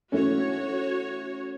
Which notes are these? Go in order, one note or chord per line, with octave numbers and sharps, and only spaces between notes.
E3 A3 C#4 F#4 C#5